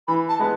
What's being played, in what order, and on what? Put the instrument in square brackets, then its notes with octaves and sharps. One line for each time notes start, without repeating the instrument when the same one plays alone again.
[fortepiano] E3 [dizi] B5
[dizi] A5
[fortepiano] G#3 B3